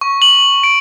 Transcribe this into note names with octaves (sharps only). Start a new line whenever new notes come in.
C#6
F#7
D7